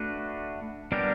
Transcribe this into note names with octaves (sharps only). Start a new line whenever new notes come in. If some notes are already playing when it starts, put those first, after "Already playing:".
Already playing: A3 D4 F#4 B4
G3 B3 D4 G4 A#4